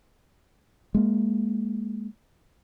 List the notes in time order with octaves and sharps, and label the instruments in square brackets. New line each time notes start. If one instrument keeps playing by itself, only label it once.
[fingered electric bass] G#3 A#3